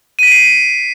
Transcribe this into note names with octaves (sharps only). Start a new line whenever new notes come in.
B6 C7 D7 D#7